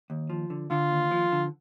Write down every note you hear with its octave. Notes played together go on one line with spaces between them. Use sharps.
D#2
F3
D3
D3 F4
D#2
F3
D3